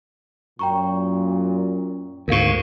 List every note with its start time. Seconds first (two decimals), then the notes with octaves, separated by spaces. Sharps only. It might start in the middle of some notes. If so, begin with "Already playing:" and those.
0.59 F#2 A#2 G5 A#5 C#6
2.28 D2 G#2 A#4 F5 C#6